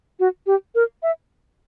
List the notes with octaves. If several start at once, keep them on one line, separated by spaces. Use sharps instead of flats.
F#4
G4
A#4
E5